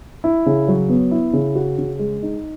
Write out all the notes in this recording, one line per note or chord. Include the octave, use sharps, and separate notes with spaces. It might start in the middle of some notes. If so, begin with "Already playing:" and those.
E4
C#3
F#3
B3
E4
C#3
F#4
C#3
G#3
D#4